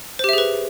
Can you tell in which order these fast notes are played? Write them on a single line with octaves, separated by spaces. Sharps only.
C5 G4 E5 G#4 B4